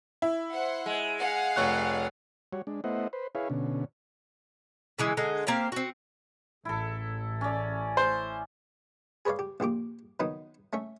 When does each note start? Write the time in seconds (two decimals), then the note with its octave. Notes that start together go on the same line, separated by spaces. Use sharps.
0.22 E4
0.52 C5 F#5
0.86 G#3
1.18 F5 F#5
1.56 F1 C#5 F#6
2.53 G3 F#4 C#5
2.67 G#3 D4
2.84 A3 B3 E4 C5 D#5 F#5
3.13 B4 C5
3.35 E4 G#4 B4 C#5 F5
3.50 B2 D3 C#4
4.98 C#3 E3 G#3
5.17 D3 G#3 D#4
5.47 A#3 C4 G4 F5
5.72 C4 F#4
6.65 A1 E4 A4
7.41 C#4 D5
7.97 C5
9.25 G#4 B4 C#5 D5 F5
9.39 G4
9.60 A#1 A#2 G4 D6
10.20 D#3 F#3 B3 D#4
10.73 A3 C#4 E5